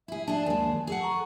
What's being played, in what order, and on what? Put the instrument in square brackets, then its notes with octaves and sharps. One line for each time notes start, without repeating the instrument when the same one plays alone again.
[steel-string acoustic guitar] E4 G#4 [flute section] E5
[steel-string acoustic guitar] D4 G#4 [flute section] A5
[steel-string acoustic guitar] D#2 G#3
[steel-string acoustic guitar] G#4 A4 F#5 [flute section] G#5
[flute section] A#5 C#6